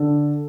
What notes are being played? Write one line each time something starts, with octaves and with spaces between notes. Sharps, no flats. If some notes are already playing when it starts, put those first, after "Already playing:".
Already playing: D3 A4